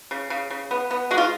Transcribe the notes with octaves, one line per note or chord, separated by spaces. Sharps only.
C#3
C#3
C#3
B3
B3
G#3 F#4
F4